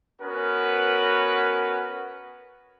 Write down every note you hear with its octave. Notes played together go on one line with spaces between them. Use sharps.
B3 C#4 F#4 A#4 B4